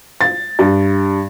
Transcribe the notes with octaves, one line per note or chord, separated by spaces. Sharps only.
A6
G2